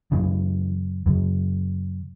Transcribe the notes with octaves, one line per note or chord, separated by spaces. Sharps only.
F#2 C#3 E3
F#2 C#3